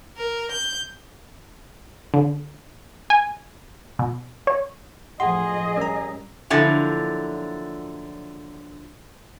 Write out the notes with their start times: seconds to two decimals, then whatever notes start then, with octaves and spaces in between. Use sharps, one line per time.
0.17 A#4
0.51 G6
2.14 D3
3.10 G#5
3.99 B2
4.47 C#5
5.20 F#2 A2 F3 G#4 D#5 F#5 C6
5.77 G3 C#4 A#4 A#5
6.50 A#2 D3 F3 F#3 E4